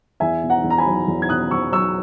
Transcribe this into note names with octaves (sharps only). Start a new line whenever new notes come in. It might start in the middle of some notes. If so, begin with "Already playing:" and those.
E2 E5 G#5
B2
F#5 A#5
E2
A#5
G#5 B5
F#3
E2
G#6
B2 D#6 F#6
E2 C#6 E6
F#3 C#6 E6